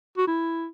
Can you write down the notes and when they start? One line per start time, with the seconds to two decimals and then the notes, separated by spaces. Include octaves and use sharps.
0.17 F#4
0.27 E4